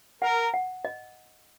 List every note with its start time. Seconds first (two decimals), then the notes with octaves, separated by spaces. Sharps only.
0.22 A#4 F#5
0.54 F#5
0.85 D#5